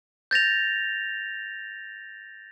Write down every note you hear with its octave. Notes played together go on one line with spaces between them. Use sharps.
G6 A6 A#6 F7